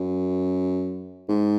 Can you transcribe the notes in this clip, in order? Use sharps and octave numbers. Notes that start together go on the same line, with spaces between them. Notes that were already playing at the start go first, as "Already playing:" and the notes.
Already playing: F#2
G#2